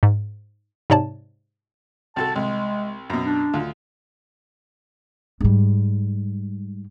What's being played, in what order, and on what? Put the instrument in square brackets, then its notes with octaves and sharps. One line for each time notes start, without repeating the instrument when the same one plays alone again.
[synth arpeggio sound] G#2
G#2 C3 C#5 D5 A5
[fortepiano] C2 F#4 A4 [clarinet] A5
[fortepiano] C2 [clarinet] G#3
[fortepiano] F#2 B2
[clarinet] D4
[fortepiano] D2 F4
[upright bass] G#2 G3